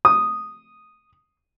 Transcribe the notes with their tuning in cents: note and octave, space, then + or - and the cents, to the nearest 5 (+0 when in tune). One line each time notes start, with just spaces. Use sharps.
D#6 -5